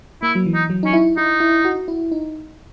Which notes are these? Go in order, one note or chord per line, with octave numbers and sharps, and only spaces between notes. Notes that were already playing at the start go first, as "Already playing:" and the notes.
A#3 E4
F#3
E3
D#4
F#3
C#4 D#4
E4
D#4 E4
E4
F#4
E4
D#4